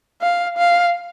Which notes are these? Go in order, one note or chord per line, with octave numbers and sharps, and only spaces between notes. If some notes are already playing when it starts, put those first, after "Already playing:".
F5
F5